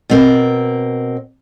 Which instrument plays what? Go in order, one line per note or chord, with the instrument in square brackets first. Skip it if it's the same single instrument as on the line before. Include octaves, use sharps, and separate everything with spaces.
[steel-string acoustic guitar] B2 C4 A#4